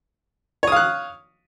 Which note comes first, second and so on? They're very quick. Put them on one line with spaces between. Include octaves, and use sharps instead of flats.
C#5 D#6 F5 F#6